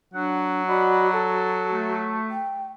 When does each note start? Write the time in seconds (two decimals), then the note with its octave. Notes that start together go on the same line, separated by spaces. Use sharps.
0.14 F#3 D4 F#5
0.67 F#4 D5 D#5 B5
1.13 F#4 A4
1.72 A3
2.30 G5